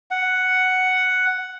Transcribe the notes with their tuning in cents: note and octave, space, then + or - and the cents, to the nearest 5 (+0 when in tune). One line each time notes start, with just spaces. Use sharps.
F#5 +5